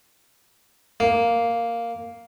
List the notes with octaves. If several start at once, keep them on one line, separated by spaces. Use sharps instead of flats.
A#3